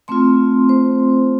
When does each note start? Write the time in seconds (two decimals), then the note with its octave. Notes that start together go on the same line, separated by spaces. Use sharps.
0.08 A3 C4 F4 C6
0.69 C5